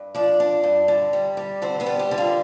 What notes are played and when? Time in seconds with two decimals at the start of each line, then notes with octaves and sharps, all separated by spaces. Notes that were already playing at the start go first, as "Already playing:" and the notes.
Already playing: G2
0.15 F3 D4 D5
0.40 D4
0.64 G2
0.88 D3
1.13 G3
1.37 G3
1.62 D3 C4 C5
1.80 B3 B4
1.86 G3
1.99 G4
2.11 D3
2.18 F4